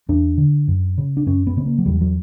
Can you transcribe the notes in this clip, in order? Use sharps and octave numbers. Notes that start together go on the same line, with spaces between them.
E2 D4
D3
F#2
C#3
D4
F#2 C#4
B3
C#3 B3
A#3
F#3
E2 G3
F#3